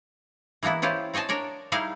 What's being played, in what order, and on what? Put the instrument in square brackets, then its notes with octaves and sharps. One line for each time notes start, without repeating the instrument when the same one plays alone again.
[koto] E3 G#3 A#3 B3 E4
C#4 E4 F4 G4 C5
C4 C#5 D#5 G#5 A5
D4 A#4 C#5 D5
G3 D#4 E4 G#4 F5